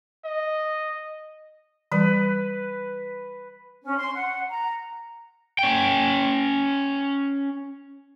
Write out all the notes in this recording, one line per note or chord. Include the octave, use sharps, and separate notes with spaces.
D#5
E3 G3 B4
C#4
C6
F#5
A#5
C#4 G5